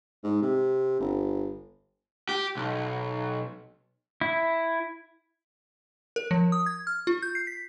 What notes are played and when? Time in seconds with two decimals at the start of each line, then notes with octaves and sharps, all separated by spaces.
0.23 G#2
0.42 C3
1.00 G1
2.29 G4
2.57 B1
4.21 E4
6.16 A#4
6.31 F3
6.52 D#6
6.66 G#6
6.87 F6
7.07 F4
7.22 G6
7.35 C7
7.47 B6